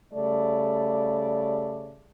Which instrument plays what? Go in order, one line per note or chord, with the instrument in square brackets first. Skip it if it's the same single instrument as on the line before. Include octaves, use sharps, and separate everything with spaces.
[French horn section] C#3 G3 A3 D5